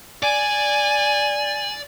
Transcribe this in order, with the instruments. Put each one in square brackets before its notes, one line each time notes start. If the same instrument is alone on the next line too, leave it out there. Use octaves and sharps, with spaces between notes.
[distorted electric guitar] D5 [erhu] G#5